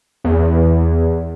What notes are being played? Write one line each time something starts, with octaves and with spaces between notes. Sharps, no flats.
E2